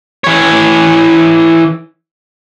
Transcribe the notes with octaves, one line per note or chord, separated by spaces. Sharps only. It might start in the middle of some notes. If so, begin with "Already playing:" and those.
E3 C#5